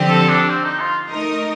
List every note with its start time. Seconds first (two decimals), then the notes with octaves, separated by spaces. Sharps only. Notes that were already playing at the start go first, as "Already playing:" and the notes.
Already playing: D3 F3 C4 G4
0.09 A4
0.29 D4
0.50 C4
0.64 D#4
0.80 F4
1.09 A3 D#4 A#4 D#5